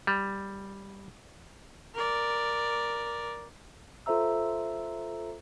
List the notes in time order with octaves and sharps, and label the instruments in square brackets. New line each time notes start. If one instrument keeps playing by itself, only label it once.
[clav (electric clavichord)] G3
[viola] A#4 D5
[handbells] F4 A4 C5 E5 A#5 E6